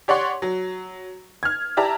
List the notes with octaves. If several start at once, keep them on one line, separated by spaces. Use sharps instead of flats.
G4 C#5 D5 F#5 C6
F#3
F6 G#6
E4 G4 D5 A5 A#5